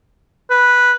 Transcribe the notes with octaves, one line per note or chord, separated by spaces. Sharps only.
B4